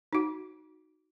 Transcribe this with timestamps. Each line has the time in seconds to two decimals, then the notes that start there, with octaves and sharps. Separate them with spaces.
0.13 D#4 F#4